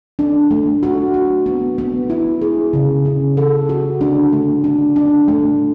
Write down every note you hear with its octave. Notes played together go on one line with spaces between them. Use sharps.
D4
A3
F#4
F#4
B3
B3
E4
G#4
C#3
C#3
A4
F#4
D4
A3
D4
D4
A3